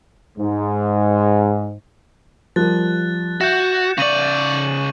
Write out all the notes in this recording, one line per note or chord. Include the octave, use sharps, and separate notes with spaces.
G#2
F3 G3 A#4 F#6 A6
F#4 E5 G6 C#7 E7
C#3 D5 C#6 D#7 F#7